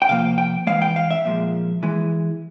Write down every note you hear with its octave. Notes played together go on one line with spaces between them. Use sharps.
G5
C3 F3 A#3 F5
G5
E3 G#3 F5
G5
F5
E5
A#2 F3 G#3
E3 G#3